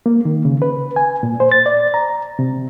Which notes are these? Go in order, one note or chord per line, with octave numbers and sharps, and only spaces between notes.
A#3
D#3
C#3
B4
G#5
A#2
C5
A6
D5
A#5
C3